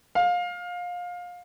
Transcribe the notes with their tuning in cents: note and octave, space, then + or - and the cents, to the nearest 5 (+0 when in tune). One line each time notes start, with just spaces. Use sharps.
F5 +25